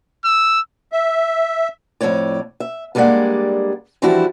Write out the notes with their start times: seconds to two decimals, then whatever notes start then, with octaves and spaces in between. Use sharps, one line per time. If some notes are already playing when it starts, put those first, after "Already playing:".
0.25 E6
0.92 E5
2.01 F2 A2 A#3 C#5 D5
2.60 E5
2.95 G2 G3 G#3 A#3 D5 F#5
4.02 E3 F3 G3 D4 E4 F#4